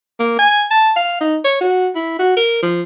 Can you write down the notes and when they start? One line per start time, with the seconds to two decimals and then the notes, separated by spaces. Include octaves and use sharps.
0.19 A#3
0.39 G#5
0.71 A5
0.96 F5
1.20 D#4
1.44 C#5
1.61 F#4
1.95 E4
2.19 F#4
2.36 A#4
2.62 F3